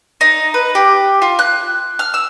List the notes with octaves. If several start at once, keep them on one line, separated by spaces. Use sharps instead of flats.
D#4
B4
G4
F4
F#6
F6
E6